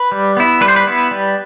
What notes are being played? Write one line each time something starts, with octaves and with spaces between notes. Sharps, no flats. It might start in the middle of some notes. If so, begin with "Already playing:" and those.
Already playing: B4
G3
B3 E4
G3 B4
C5
B4
B3 E4
G3